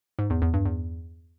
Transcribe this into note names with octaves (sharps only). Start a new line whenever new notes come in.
G#2
E2
E2
G2
E2